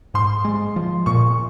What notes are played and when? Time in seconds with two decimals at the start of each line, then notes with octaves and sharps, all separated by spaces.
0.14 G#2 C6
0.45 G#3
0.76 F3
1.06 A#2 C#6